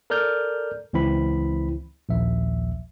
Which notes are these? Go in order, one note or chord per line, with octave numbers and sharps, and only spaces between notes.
A4 A#4 D5 F6 G6
C#2 E3 C4 E4 B5
A#1 D#2 E5